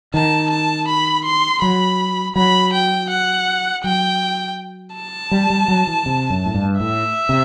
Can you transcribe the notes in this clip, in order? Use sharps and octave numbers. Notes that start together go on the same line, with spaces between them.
D#3 A5
A5
B5
C6
F#3 B5
F#3 B5
G5
F#5
F#3 G5
A5
G3
G3
F#3
E3
C3
F#2
A2
G2
A2 E5
C3